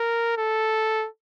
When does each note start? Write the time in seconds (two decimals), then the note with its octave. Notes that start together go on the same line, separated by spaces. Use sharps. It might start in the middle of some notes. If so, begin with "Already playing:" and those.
Already playing: A#4
0.37 A4